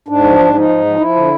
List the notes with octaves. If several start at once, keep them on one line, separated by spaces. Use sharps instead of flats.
G#2 D4
F3
G#2
F3 D#4
G#2
F3
F3 E4
D3